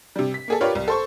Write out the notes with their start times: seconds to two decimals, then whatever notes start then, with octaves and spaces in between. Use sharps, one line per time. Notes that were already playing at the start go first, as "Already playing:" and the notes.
0.16 C3 G3
0.34 B6
0.48 A#3 G#4 A4
0.61 F4 G4 A#4 B4 C#5 D5
0.75 C2
0.88 A4 C5 C#6